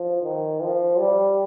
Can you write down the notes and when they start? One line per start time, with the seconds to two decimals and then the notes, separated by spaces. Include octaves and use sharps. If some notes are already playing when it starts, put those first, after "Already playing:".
Already playing: F3
0.22 D#3
0.60 F3
0.98 G3